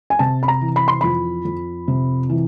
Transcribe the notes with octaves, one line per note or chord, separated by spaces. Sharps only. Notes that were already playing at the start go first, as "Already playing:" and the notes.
G#5
C3 A5
B5
A#5
E3
B5
C6
F2 B5
F2
C3
E3